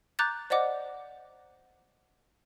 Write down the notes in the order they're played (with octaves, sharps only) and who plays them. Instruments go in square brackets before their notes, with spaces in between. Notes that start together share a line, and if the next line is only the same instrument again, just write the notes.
[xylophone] A#5 D6 F#6 G6 A6
C5 D5 D#5 F#5 D6